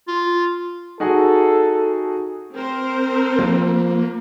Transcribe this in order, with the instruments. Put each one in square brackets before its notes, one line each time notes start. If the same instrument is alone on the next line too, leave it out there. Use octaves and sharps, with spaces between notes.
[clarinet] F4
[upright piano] D#4 F#4 G#4 [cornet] A4
[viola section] C4 A#4 C5
[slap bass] F3 [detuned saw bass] A#3